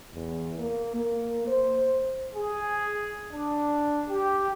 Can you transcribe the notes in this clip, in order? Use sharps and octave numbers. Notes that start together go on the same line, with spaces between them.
E2
A#3
A#3
C5
G#4
D4
G4